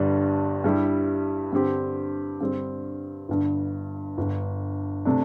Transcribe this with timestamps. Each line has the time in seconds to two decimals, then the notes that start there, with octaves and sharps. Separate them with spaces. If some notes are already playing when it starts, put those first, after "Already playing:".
Already playing: G1 G2 D3 G3 D4
0.64 G2 G3 E4 G4
1.52 G2 D3 C4 G4
2.40 G2 D3 G3 C4
3.28 G1 G2 D3
4.17 G1 G2 D3
5.05 C3 A3 D4